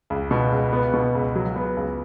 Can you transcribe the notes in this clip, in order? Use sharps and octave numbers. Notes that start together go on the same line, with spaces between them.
C#2
B2
C#2
B3
B2
C#2
F#3
B3
C#2